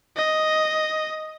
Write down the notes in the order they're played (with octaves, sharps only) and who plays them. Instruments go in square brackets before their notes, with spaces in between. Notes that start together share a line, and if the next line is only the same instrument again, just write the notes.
[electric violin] D#5